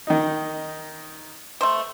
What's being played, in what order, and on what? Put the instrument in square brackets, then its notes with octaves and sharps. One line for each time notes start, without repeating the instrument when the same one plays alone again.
[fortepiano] D#3 D#4
[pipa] A3 C5